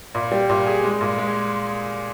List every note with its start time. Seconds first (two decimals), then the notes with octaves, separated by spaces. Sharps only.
0.15 A#2
0.32 G3
0.50 A#2
0.66 G#4
0.83 G#3
1.01 A#2
1.18 G#3